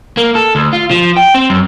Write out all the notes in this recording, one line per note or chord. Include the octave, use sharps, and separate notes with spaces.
A#3
A4
D2
F4
F3
G5
C4
F#2